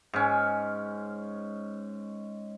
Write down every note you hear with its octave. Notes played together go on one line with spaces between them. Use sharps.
G#2 C#4